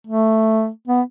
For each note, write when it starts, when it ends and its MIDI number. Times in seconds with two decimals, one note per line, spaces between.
0.07 0.68 57
0.87 1.02 59